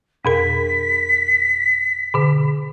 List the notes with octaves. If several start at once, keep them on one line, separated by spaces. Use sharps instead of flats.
F2 B2 A#4 B6
B2 D3